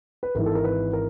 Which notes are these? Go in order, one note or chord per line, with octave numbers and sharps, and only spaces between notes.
B4
G#1 G#2 E3 A#4
A4
A#4
B4
A#4